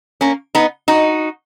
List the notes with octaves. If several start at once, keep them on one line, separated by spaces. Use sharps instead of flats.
A#3 C#4
B3 D#4
D#4 F#4